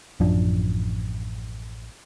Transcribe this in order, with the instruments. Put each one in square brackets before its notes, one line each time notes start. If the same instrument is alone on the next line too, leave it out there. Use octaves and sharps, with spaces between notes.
[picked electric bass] A1 F#2 F3 D4